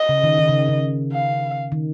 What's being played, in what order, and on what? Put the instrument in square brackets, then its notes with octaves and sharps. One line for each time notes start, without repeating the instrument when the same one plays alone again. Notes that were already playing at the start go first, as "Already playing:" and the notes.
Already playing: [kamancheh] D#5
[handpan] C#3
D#3
D#3
C#3
C#3
[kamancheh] F5
[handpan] D#3